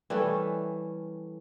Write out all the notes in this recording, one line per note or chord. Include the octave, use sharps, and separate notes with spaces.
E3 G3 A3 C#4